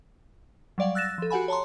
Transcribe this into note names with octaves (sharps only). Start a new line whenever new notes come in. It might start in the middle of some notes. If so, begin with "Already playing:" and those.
F#3 G3 D5 F5 F#5
E6 F#6 A6 A#6 E7
F3 A4
F#4 G4 F#5 G#5 B5
C#5 A5 A#5 C6